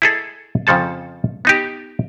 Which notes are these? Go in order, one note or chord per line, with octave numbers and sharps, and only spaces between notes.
E4 G#4 A4 D#5
F2 C#3 F3 A4 A5
B3 D#4 G4